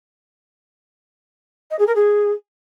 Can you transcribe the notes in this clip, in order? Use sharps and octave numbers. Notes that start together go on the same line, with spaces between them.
D#5
G#4
A#4
G#4